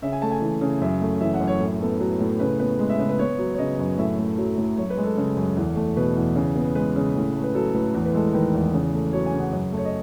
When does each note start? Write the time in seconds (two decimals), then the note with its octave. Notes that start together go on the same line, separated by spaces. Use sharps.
0.02 C#3 E5
0.12 G#5
0.22 A3 A5
0.31 G#5
0.42 E3
0.61 C#3
0.81 F#2 E5
1.01 A3
1.21 E3 E5
1.34 F#5
1.40 F#2
1.48 C#5
1.60 A2
1.81 B3 A4
2.00 F#3 B4
2.20 A2
2.40 C#3 B4
2.59 B3 B4
2.79 G#3
2.90 E5
2.99 C#3 B4
3.09 B4
3.19 B3 C#5
3.39 F#3
3.54 C#5
3.58 C#3 D#5
3.79 F#2
3.98 A2 E5
4.18 A3
4.38 F#3
4.58 A2
4.77 F#2 C#5
4.90 B4
4.97 G#3
5.04 A4
5.17 C#3
5.37 F#2
5.57 E2
5.76 A3
5.96 B2 B4
6.16 E2
6.35 C#3
6.56 B3
6.75 G#3 B4
6.96 C#3
7.15 A2
7.35 A3
7.44 B4
7.55 F#3 A4
7.74 A2 B4
7.94 E2
8.05 B4
8.14 G#3 A4
8.33 D#3 B4
8.54 E2
8.73 C#3
8.94 A3
9.13 F#3 C#5
9.26 G#5
9.33 C#3
9.40 F#5
9.53 F#2
9.72 A3
9.77 C#5
9.85 D#5